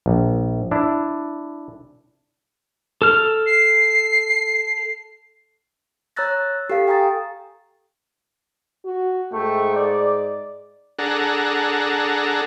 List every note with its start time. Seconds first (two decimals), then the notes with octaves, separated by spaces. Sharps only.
0.06 A#1
0.71 D4 E4
3.02 A4 F6
3.46 C7
6.16 C#5 A#5 E6 F#6 A6 A#6
6.70 G4 A4 F5 C7
6.87 F5 G5 G#5 A#5 D#6 A6
8.86 F#4
9.34 G#2 A3 G5 C#6
9.74 D5
10.99 D4 G#4 A4 F#5 A#5